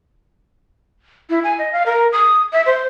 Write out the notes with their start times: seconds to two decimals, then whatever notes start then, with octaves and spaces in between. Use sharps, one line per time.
1.30 E4
1.44 G#5
1.59 D#5
1.73 F5
1.86 A#4
2.12 D#6
2.53 E5
2.66 C5